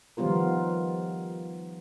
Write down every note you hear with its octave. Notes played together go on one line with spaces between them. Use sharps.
D#3 F3 G3 B3 F4 A#4